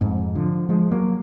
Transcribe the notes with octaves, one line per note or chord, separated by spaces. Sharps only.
F2 G#2
D3 F3
F3 G#3
F#3 A#3